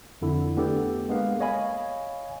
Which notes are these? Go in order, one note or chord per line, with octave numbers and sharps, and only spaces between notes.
F2 D3 E4
A3 B3 D4 G4 A4
G#3 A#3 B3 F5
C#5 D#5 F5 G#5 B5